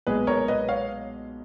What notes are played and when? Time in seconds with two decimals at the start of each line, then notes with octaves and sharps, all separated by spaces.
0.07 B1 A#2 G#3 G#4 B4
0.27 A#4 C#5
0.48 B4 D#5
0.69 C#5 F5